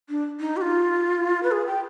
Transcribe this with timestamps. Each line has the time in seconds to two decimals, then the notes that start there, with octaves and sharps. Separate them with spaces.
0.09 D4
0.40 D#4
0.57 G4
0.61 F4
1.43 B4
1.51 G#4
1.67 G5